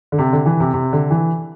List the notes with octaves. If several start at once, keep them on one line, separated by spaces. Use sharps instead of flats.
D3
C3
D3
E3
C3
C3
D3
E3